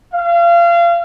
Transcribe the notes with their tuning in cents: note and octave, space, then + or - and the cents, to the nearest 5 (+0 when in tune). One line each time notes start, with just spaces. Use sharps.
F5 -30